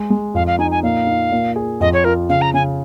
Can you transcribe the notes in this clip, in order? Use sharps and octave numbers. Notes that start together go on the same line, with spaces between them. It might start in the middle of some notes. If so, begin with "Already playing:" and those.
Already playing: G#3
G#3
F2 F5
F5
D#4 G#5
G#5
A#2 F5
D#4
A#2
G#4
F2 D#5
C#5
F4 A#4
C#3 F5
A#5
C#3 G#5